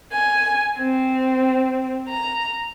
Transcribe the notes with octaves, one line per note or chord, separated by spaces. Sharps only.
G#5
C4
A#5